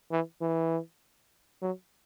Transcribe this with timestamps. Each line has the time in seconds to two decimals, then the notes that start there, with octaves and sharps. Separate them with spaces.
0.11 E3
0.41 E3
1.62 F#3